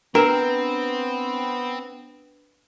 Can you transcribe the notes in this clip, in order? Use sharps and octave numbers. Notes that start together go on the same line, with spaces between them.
B3 C4 D4 A#4 B4